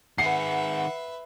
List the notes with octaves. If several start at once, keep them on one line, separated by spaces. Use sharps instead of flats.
D#3 G#4 B4 E5 F#5 C7